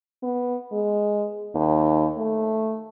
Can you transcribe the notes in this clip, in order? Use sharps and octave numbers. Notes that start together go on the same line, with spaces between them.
B3
G#3
D#2
A3